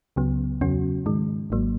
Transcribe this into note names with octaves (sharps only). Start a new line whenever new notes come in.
C#2 C#3 F#3 B3
E2 C#3 F#3 C#4 F#4
G#2 D#3 G#3
G#1 G#2 F#3 A#3